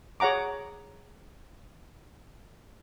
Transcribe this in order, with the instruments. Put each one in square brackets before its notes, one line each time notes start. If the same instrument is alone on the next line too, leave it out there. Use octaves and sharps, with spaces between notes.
[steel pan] G#4 C#5 F#5 A#5 D6